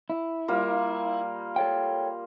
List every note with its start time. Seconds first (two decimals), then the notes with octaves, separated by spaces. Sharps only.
0.10 E4
0.48 G3 A#3 F4
1.56 A4 C#5 G5